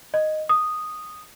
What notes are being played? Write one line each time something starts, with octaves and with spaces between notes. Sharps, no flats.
D#5
D#6